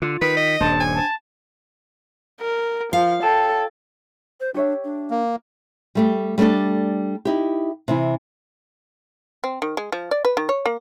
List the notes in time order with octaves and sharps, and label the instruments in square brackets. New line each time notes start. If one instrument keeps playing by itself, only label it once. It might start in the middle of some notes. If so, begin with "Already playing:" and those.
[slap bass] D3 [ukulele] F4
[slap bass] D#3 [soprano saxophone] B4 [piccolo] B6
[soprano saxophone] D#5
[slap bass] D#1 G2 [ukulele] D4 C5 [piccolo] A5
[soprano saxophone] G#5
[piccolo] A5
[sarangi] A#4
[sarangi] F3 [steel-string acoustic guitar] F5
[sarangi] A4 [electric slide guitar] C#5 G5 A5
[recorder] C5
[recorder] D4 [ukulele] G4 C#5 E5
[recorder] D4
[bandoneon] A#3
[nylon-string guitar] G3 A3 G4
G3 A3 C4 D4 A4
D#4 E4 G4
C3 E3 E4
[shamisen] C4
D#3
G#3
F3
D5
B4
D#3
C#5
A#3